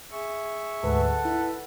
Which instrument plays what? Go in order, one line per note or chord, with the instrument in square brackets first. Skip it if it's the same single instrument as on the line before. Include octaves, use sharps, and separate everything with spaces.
[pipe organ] G#4 E5 C#6
[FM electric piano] D2 G#2 B4 [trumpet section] A4 F#5
[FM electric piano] E4 [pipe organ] B4